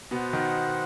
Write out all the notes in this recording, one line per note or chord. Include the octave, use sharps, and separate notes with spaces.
B2 B3 F#4 C5 F#5
D#3 D#4